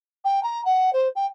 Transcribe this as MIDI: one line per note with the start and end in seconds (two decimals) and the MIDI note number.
0.24 0.42 79
0.43 0.63 82
0.65 0.92 78
0.93 1.08 72
1.15 1.26 79